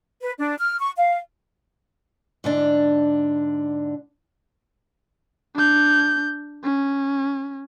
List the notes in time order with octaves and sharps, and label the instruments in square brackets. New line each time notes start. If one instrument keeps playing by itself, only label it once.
[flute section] B4
D4
F6
C#6
F5
[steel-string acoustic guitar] G#2 D3 D4
[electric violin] D4 G6
C#4